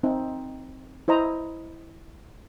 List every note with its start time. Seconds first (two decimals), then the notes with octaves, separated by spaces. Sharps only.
0.03 C4 D#4
1.08 E4 C5 D#5 A#5